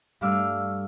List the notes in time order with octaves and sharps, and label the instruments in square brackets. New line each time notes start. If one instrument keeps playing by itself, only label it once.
[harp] G2 A3 D4 F5 D6 E6